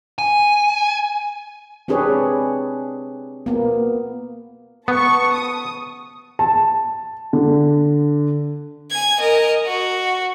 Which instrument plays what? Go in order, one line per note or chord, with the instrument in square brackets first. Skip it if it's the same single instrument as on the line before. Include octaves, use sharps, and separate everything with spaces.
[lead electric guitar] G#5
[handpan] C4 D4 G4 G#4 B4 C#5
A#3 B3
[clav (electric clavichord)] B3 [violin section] A5 C#6
[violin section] D#6
[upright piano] A5
D3
[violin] G#5 G#6
A#4 D#5
F#4